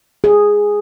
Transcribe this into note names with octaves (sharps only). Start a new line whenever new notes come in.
G#4